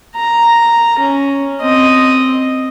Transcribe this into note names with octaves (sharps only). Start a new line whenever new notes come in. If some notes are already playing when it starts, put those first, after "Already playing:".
A#5
C#4
C4 D#5